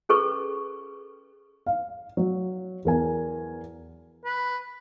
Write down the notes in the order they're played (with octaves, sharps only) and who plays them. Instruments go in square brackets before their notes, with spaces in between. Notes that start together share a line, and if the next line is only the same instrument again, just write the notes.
[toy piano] C#4 G#4 A4 B4 C#6
[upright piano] F5
F#3
E2 A#4 G#5
[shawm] B4